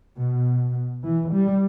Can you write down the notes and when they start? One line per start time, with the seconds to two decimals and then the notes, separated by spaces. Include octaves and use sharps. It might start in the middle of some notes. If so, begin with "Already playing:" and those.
0.18 B2
1.04 E3
1.32 G3